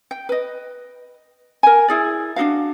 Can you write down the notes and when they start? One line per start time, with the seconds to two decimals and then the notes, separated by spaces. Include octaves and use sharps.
0.11 G5
0.29 B4 D#5
1.63 A#4 G#5
1.88 E4 G#4 D5
2.36 D4 D#4 F#4 F5